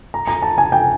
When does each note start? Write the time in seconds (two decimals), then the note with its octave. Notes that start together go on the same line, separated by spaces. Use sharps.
0.14 A#5
0.27 A#5
0.42 A5
0.58 G#5
0.72 G5